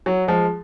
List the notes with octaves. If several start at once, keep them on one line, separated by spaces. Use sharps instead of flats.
F#3
F3 G#3